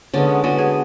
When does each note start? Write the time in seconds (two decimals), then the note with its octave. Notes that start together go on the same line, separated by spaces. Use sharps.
0.14 D3 G#3 B3 C#4
0.43 D3 G#3 B3 F#4
0.58 G#4